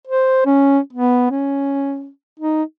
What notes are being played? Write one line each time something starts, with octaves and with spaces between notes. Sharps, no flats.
C5
C#4
B3
C#4
D#4